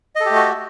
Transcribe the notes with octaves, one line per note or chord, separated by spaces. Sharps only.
A3 F#4 G4 A4 D#5